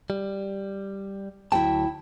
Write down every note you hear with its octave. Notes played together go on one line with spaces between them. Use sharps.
G3
D2 F#3 E4 G5 A5